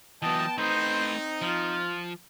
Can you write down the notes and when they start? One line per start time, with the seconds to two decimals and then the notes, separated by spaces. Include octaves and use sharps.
0.22 E3 F#3 B3 D#5 G5 A5
0.58 A3 C4 D#4 B4 C5
1.42 F3 F4